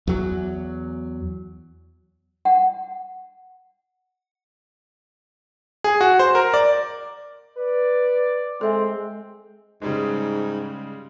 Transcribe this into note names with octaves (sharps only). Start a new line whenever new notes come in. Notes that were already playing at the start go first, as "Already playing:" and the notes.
E2 F#3
F#5
G#4
F#4
C5
A#4
D5
B4 D5
G#3 C4 A4 E5 G#5
G#2 C#3 G3 G#3